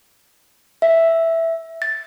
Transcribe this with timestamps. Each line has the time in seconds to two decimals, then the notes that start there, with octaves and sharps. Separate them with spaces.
0.82 E5
1.82 A6